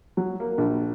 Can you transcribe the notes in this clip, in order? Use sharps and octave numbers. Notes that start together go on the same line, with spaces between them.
F#3
A#3
A#1